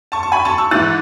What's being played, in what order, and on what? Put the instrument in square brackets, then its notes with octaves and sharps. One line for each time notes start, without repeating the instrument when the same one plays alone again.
[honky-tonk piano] A5 C#6
C#6
G#5 B5
A5 C#6
C#6 E6
G#2 E3 F#6 A6